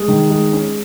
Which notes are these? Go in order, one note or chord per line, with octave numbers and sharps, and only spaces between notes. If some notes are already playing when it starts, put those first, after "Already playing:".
Already playing: G#3
D#3
G#3
C#4